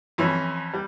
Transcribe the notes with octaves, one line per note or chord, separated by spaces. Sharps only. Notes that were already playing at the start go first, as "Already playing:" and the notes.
F2 E3 C#4
G3